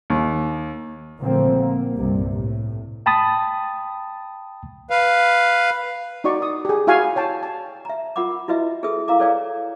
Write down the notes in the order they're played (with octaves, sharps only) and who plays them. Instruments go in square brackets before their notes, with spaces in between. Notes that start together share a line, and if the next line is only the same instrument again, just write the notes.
[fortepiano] D#2
[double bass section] A#2 D3 F3 A3 A#3 C4
A#3
C2 G2 C3 G3
A2
[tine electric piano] G5 A5 B5 D#6 A6
[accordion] B4 F5
[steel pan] D#4 F#4 D5 C#6
D#6
G4 G#4
E4 F#4 F5 G#5 C#6
C#5 G5 A5
A5
[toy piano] E5 A#5
F4 A#4 F#5 B5 D6
E4 F#4 B4 D#5 E5
G#4 A4 B4 E5 D#6
E4 A#4 F5 A#5 D6
A4 B4 C#5 D5 F5 G5